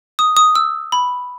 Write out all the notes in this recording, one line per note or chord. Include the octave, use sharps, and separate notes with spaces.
D#6
D#6
E6
B5